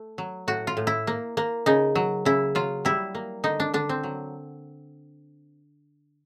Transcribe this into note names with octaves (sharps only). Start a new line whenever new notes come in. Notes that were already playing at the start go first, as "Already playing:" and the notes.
Already playing: A3
F#3
A2 F#4
F4
A2
E4
A#3
A#3
C#3 D#4
F#3
C#3 E4
F#3 F4
G3 E4
A#3
D3 D#4
D4
D3 D4
C4
F#3